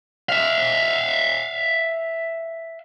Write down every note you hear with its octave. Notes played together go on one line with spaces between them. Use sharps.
E5 F5